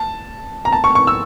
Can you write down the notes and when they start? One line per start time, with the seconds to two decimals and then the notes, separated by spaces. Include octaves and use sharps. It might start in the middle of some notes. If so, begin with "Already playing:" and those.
Already playing: A5
0.65 A#5
0.73 A5
0.84 C#6
0.95 C#6
1.07 E6